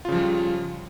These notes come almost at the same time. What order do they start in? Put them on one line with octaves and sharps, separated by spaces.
F4 C#3 F3 G3